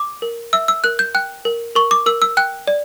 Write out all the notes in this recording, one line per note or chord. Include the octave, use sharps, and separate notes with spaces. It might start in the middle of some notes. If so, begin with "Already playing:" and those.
Already playing: D6
A#4
E5 E6
E6
A#4 F#6
G6
G5 F#6
A#4
A#4 C#6
D6
A#4 E6
E6
G5 F#6
D5